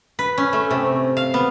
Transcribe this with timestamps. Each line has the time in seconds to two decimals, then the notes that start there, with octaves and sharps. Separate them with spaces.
0.19 B4
0.38 C#4
0.53 A3
0.71 C3
1.17 F5
1.34 B3